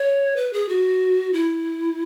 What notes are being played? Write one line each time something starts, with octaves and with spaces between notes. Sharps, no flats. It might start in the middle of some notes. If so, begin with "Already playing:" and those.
Already playing: C#5
B4
G#4
F#4
E4